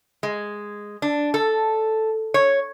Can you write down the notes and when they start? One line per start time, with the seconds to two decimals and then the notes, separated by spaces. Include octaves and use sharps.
0.23 G#3
1.02 D4
1.34 A4
2.34 C#5